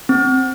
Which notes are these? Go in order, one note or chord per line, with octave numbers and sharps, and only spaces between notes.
C4